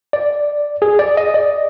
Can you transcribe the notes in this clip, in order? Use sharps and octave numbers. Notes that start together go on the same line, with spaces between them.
D5
G#4
D5
D#5
D5